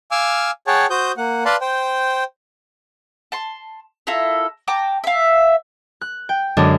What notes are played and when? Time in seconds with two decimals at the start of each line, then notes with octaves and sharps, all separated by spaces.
0.11 F5 G#5 D6 E6 F6
0.67 G#4 C#5 F#5 G5 A5
0.90 F#4 C5 D#6 G6
1.17 A#3 F#5
1.45 B4 D5 F5 A5 B5 C6
1.61 C5 G5
3.32 A5 C6
4.07 E4 F4 A4 A#4
4.68 G5 A5 A#5 D6
5.04 E5 F5
6.01 F#6
6.29 G5
6.57 F#2 D3 G#3 D4